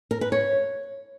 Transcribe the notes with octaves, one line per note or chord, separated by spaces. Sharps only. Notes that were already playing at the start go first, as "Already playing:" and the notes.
A#4
B4
C#5